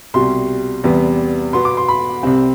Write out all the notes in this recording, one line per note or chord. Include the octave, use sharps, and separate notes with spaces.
C2 B2 G3 C6
E2 C3 G3 B3
B2 B3 C6
D6
C6
B5
C2 C3 G3 C4